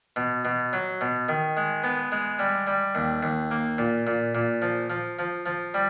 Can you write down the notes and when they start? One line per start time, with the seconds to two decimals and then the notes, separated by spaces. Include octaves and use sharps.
0.16 B2
0.45 B2
0.73 F#3
1.01 B2
1.29 D#3
1.57 G#3
1.84 B3
2.12 G#3
2.39 G3
2.67 G3
2.95 D#2
3.23 D#2
3.51 A#3
3.78 A#2
4.07 A#2
4.35 A#2
4.62 F3
4.90 F3
5.19 F3
5.46 F3
5.74 G3